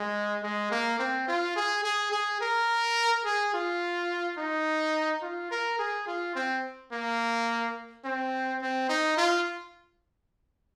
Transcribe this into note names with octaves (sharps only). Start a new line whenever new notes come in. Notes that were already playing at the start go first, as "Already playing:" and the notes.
Already playing: G#3
G#3
A#3
C4
F4
G#4
G#4
G#4
A#4
G#4
F4
D#4
F4
A#4
G#4
F4
C4
A#3
C4
C4
D#4
F4